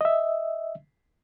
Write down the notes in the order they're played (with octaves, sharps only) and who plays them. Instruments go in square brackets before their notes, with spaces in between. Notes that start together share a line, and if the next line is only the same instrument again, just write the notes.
[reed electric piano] D#5 E5